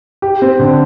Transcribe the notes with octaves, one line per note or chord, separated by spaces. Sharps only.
G4
C4
D3